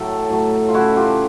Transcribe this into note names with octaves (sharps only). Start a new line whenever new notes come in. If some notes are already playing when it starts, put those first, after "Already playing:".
Already playing: A2 F#3 A3 A4
A2 F#3 A3
F4
C#3 F#3 A3 E4 F#4
F4 G4